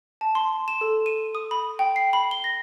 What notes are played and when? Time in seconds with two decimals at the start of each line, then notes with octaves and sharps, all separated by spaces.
0.21 A5
0.35 C6
0.68 E7
0.81 A4
1.06 D#7
1.35 D#6
1.51 B5
1.79 G5
1.96 C7
2.13 B5
2.31 G7
2.44 A#6